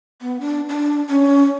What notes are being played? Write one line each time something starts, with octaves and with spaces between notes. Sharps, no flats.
B3
D4
D4
C#4